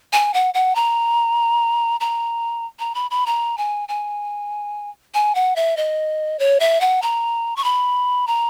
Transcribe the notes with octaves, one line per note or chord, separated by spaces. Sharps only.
G#5
F#5
F#5
A#5
A#5
A#5
B5
B5
A#5
G#5
G#5
G#5
F#5
E5
D#5
C#5
E5
F#5
A#5
C#6
B5
A#5